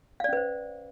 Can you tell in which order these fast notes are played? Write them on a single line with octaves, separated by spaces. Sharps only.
F5 D5 C#4 B4 C5